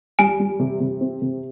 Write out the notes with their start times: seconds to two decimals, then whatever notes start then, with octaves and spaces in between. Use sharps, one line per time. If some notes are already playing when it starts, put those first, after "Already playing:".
0.19 G3 G#5
0.40 G3
0.60 C3
0.80 C3
1.01 C4
1.22 C3